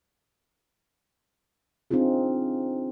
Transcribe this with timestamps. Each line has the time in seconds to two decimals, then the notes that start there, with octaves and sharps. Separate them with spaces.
1.91 C4 D4 D#4 F4 G#4